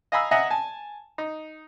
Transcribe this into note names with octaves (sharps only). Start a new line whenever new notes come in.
D#5 F5 G#5 A#5 B5 E6
D#5 E5 F#5 G#5 A#5
G#5 A5
D#4